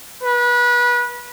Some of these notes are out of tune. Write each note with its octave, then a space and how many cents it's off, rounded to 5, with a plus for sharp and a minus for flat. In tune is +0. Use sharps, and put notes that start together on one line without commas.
B4 -25